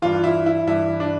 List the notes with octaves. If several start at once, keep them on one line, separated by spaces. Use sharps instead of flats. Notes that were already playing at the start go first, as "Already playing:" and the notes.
G2 E3 F4
E4
E4
G2 E3 E4
D4